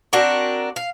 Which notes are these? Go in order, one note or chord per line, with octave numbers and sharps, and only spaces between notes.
C4 D4 F#4 A#4
F5